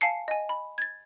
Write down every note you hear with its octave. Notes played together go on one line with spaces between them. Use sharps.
F5 G#5 A5 C7 C#7
D#5 G#5
B5
G#6 A6